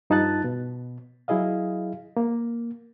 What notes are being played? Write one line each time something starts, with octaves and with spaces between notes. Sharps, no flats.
G2 D#4 F4 A5 F#6 A6
B2
F#3 E4 G#4 D#5 F5
A#3